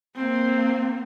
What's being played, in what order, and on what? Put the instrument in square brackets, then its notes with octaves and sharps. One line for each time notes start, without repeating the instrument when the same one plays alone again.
[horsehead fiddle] A#3 C4